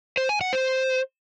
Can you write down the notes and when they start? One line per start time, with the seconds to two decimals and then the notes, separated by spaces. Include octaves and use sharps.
0.17 C5
0.29 G#5
0.41 F#5
0.53 C5